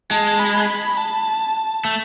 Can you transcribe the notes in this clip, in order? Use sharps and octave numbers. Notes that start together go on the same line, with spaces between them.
G#3 A5
B5
B5
A5
A3